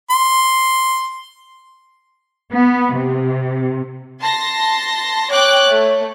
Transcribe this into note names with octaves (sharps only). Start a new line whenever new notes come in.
C6
B3
C3
A5 C6 A#6
C#5 G5 D6 F#6
A3